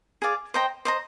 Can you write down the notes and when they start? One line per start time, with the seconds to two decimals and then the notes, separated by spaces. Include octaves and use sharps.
0.22 G#4 D5 F5
0.54 C5 D#5 G5 A#5
0.85 C5 D#5 A#5